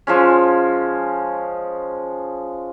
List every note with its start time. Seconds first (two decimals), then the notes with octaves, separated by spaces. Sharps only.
0.07 F3 G#3 C#4